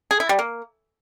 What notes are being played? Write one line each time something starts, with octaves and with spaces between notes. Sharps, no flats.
G#4
E4
G3
A#3